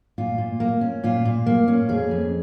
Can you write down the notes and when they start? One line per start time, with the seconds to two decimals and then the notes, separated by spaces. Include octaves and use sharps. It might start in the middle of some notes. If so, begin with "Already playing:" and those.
0.18 A#2 F4
0.38 A#2
0.60 A#3
0.81 C#4
1.03 A#2 F4
1.25 A#2
1.46 A#3
1.68 C#4
1.89 F2 G#4
2.11 F2